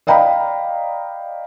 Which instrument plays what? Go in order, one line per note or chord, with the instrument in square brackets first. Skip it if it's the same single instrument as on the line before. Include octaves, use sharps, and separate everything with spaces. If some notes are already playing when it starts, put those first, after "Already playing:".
[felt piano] D5 D#5 F5 G5 A#5 B5